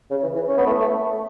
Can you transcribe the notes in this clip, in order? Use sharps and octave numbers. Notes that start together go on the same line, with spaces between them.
C#3
E3
E3
C#4
B3
A3
A3